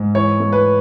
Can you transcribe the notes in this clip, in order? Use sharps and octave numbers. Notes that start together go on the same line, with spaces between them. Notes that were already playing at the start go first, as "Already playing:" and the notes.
Already playing: G#2
E3 C#5
A3
B4